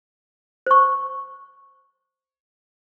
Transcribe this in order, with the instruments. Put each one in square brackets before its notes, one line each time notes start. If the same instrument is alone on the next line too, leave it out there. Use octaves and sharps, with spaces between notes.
[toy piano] C5 C#6